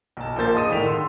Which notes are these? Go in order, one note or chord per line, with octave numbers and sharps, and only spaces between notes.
B1 A5
A#1 A#3 C5 A6
G#4 D#5 D#6 D#7
A2 D3 D#3 G5 B6 F7
C6 E6